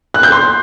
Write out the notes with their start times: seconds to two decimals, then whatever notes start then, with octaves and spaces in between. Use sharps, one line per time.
0.14 F#6
0.23 G6
0.32 C6